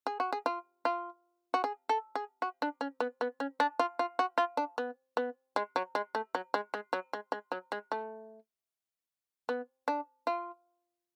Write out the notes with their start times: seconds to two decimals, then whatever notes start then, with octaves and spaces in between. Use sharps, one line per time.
0.07 G#4
0.20 F#4
0.33 G#4
0.46 F4
0.85 F4
1.54 F#4
1.64 G#4
1.89 A4
2.15 G#4
2.42 F#4
2.62 D4
2.81 C#4
3.00 B3
3.21 B3
3.40 C#4
3.60 D4
3.79 F4
3.99 F4
4.19 F#4
4.38 F4
4.57 D4
4.78 B3
5.17 B3
5.56 G#3
5.76 F#3
5.95 G#3
6.15 A3
6.35 F#3
6.54 G#3
6.74 G#3
6.93 F#3
7.13 G#3
7.32 G#3
7.52 F#3
7.72 G#3
7.92 A3
9.49 B3
9.88 D4
10.27 F4